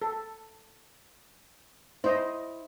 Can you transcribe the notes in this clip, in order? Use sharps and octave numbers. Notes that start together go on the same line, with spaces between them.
A4
E4 C5 D#5